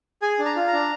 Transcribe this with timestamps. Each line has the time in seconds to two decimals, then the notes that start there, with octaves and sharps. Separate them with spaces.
0.22 G#4 G#5
0.39 D4
0.45 A#5
0.56 F4
0.67 A#5
0.73 D4